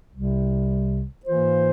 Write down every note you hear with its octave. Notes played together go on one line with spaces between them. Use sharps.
C2 C3 G3
G#2 E3 A#3 F4 C5